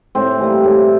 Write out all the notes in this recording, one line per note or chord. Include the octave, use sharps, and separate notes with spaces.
A2 C4
E3 G3 A#3
A2